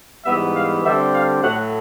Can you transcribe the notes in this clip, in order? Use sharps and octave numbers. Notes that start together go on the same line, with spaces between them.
G#2 E3 G3 B3 E5
F5
D3 G3 C4 E5
F5
A2 F#3 A3 F#5